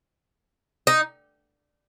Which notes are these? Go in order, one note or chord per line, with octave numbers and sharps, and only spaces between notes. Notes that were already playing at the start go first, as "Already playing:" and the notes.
D#4